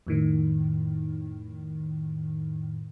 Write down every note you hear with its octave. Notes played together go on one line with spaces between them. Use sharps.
F2 A2 D#3